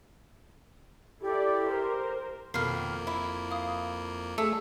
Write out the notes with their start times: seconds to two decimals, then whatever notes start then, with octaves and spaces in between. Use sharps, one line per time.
1.22 E4 G4 A4 D5
1.70 A#4 C5
2.54 F2 B2 D#3 A#3 A4 F6 C7
3.07 E4
3.51 F5 D#6
4.38 A3 G#4 E6